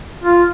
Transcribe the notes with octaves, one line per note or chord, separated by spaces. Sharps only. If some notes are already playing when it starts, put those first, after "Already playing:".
F4